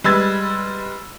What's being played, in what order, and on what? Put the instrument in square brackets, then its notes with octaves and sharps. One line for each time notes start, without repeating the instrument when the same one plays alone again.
[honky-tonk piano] G3 G#3 B4 E6 G#6 A6